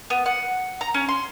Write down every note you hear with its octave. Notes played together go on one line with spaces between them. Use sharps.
B3
F#5
A#5
C#4
C6